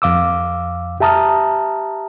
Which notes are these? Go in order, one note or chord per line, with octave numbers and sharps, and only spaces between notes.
F2 F5 D6 E6
G4 E5 A5 A#5 D#6 F6